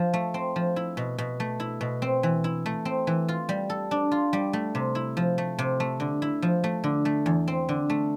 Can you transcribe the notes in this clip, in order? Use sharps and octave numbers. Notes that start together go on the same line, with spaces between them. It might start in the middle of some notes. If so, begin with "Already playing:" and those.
Already playing: F3
A3
C4
F3
E4
B2
B2
A3
E4
B2
C4
E3
E4
A3
C4
E3
F4
G3
A4
D4
F4
G3
A3
C3
E4
F3
A3
C3
A3
D3
E4
F3
A3
D3
A3
E2
C4
D3
A3